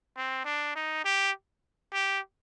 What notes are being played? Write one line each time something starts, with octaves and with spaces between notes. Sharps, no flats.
C4
D4
D#4
G4
G4